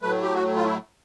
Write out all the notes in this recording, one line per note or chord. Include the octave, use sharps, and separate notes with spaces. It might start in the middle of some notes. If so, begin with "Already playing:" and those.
A2 F#3 A3 B4
G4
F#4
F4
E4